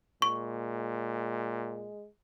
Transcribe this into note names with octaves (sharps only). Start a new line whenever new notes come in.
A#2 G#3 C#6